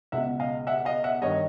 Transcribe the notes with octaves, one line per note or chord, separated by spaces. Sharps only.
C#2 B2 E5 F#5
D#5 F5
E5 F#5
D#5 F5
E5 F#5
G2 D#3 C#5 D#5